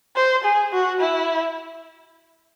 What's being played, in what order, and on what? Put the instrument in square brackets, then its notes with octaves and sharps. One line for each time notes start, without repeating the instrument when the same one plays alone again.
[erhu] C5
G#4
F#4
E4